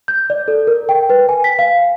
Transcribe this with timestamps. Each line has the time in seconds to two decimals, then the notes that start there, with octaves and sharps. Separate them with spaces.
0.08 G6
0.30 D5
0.48 A4
0.67 A#4
0.89 G5
1.10 B4
1.29 G#5
1.44 B6
1.59 F5